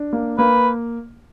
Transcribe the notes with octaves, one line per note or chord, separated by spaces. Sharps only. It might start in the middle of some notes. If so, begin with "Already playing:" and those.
Already playing: D4
A#3
A#3 B4